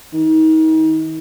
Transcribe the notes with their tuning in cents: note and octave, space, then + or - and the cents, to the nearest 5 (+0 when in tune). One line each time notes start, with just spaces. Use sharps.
D#3 +35